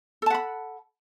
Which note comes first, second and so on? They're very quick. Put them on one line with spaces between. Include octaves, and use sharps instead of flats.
A4 A5 F#5 B5